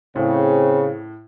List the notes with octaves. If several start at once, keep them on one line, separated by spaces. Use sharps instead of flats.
A2 C#3 C4